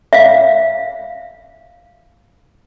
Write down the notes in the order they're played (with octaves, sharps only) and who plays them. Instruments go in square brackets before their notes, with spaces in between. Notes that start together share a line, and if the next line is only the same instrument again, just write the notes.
[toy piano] E5 F5